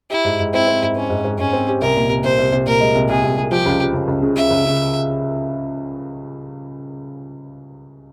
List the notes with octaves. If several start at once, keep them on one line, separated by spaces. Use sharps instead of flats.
E4 G4
G#2
G#2
C4 E4
C4
G#2
C4 C#4
G#2
G#2
G#2 C#4
C4
G4
C2 A#4
A#2
C2
C2 C5
C2
C2
A#2 A#4
G#3
C2
C2 G#4
C2
C2
F3 G4
C#2
F3
C#2
C#2
C#3
C#3 E5
C#2
C#3